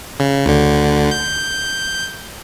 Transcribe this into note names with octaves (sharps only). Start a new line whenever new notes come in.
C#3
D2 D3
G6